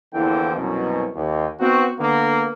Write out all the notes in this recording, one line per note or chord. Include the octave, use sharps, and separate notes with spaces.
E2 D3 E3 F3 A#3 G5
C2 F#2 B2
D#2
B3 C4 D#4 F#4
D3 A#3 B3